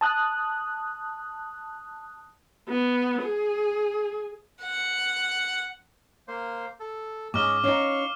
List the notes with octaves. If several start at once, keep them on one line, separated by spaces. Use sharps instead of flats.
A5 D#6 F#6
B3
G#4
F#5
A#3 C5
A4
G#2 C#4 D#5 D6 F6
C#4 D#4 F5 C#6